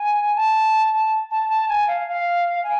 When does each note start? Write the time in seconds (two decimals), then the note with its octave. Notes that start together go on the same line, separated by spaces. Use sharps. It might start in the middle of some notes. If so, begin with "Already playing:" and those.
Already playing: G#5
0.36 A5
0.93 A5
1.31 A5
1.50 A5
1.69 G#5
1.87 F5
2.07 F5
2.64 G#5